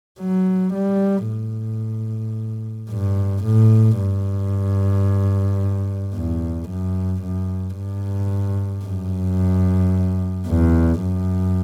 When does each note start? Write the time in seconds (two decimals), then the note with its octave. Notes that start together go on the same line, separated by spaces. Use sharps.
0.20 F#3
0.74 G3
1.28 A2
2.90 G2
3.44 A2
3.99 G2
6.15 E2
6.69 F#2
7.23 F#2
7.77 G2
8.85 F#2
10.47 E2
11.01 F#2